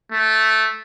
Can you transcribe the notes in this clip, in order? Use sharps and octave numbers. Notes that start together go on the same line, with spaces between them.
A3